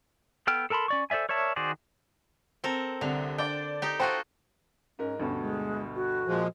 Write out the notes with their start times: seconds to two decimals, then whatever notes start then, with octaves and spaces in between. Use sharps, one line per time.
0.47 B3 A4 G5 F6
0.70 A4 A#4 A5 B5 C6
0.88 C#4 D5 C#6
1.10 A4 C5 D5 E5 G#5
1.29 A#4 C#5 D5 E5 A5
1.56 D#3 F#4 G#4 C5 D5
2.64 C4 A4 A#4
3.01 C2 D3 F7
3.38 D4 D5 G5
3.82 D#4 G4
4.00 F4 F#4 A4 C5 G5
4.99 G#2 C#4 A#4
5.20 D2 G2 B2 C#4
5.41 G#3
5.95 F#4
6.27 A#2 F3 G#3